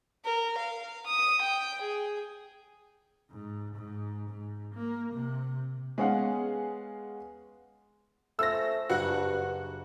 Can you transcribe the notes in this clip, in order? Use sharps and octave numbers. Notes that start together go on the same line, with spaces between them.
A#4
F5
D#6
G5
G#4
G#2
G#2
G#2
A#3
C3
G#3 B3 C#4 G#4 F5 F#5
A3 C#4 F4 C5 E6 A#6
F#1 G2 F#4 F#5 F#6